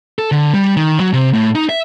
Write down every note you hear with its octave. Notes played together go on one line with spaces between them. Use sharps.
A4
D3
G3
D#3
F#3
C3
A2
D#4
E5